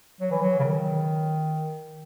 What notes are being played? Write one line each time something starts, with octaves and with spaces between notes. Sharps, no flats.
F#3
E3
F#3
C#3
D#3